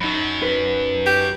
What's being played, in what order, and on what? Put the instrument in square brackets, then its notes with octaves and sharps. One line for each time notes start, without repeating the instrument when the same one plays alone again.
[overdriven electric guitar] F#2 F#3 [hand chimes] D#4 B5
[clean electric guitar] B4
[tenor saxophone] G4